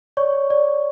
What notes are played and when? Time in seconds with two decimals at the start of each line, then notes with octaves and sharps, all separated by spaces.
0.17 C#5 D5 C#6
0.50 D5